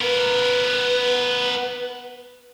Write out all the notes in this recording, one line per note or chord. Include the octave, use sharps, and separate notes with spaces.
B3 A#4 B4